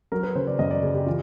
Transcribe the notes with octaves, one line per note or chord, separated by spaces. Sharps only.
F#3 A#4
B4
C#3 C5
D5
F#2 D#5
D5
C#3 G#4
G4
E3 F4